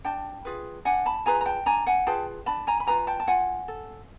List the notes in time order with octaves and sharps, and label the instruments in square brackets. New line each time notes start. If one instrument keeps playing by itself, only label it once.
[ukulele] D4 G5 A5
F4 G#4 B4
D4 F#5 G#5
A5 B5
F4 G#4 B4 G#5 A#5
A#5
G5 A5
D4 G#5 A#5
F#5 G#5
F4 G#4 B4 G5 A5
D4 A5 B5
G#5 A#5
B5
F4 G#4 B4 G#5 A#5
G5 A5
A5
F4 F#5 G#5
A4